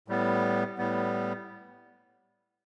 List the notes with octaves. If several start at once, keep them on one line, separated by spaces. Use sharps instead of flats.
A2 G3 B3
A2 G3 B3